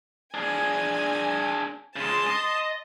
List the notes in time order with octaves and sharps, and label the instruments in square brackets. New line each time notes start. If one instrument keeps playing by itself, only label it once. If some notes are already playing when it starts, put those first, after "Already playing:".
[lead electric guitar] D4 G#4 [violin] G#5
[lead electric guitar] C#3 G#3 [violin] A5 C6
[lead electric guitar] D#5